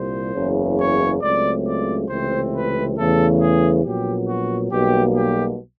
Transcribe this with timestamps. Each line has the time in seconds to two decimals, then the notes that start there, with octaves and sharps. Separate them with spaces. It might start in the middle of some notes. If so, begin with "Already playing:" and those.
Already playing: C2 A#2 G3 C5
0.34 F#1 E2 C#3
0.78 C#5
1.21 C#2 C#3 F#3 A3 C4 D5
1.66 D5
2.08 C#2 C3 E3 A3 C4 C5
2.53 B4
2.95 E2 C#3 E3 A3 A4
3.39 G#4
3.83 A#1 A#2 F#3 B3 G4
4.27 F#4
4.70 B1 B2 G3 A#3 G4
5.14 G4